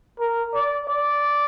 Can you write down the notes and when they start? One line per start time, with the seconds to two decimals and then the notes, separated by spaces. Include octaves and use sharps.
0.20 A#4
0.54 D5
0.88 D5